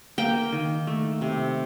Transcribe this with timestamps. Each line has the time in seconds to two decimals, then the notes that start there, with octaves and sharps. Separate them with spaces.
0.18 A#3 G5
0.52 D#3
0.87 A3
1.21 C3